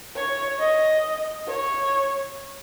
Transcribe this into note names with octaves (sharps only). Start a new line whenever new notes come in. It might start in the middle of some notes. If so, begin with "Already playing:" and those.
C#5
D#5
C#5